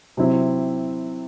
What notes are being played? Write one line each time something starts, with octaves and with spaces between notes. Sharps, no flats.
C3 F#3 C4 E4